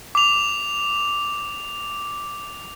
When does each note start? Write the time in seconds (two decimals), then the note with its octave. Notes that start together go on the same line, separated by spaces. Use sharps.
0.15 D6 F7